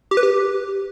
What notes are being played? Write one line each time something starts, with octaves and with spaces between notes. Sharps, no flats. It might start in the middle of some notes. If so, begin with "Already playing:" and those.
G4
B4
G4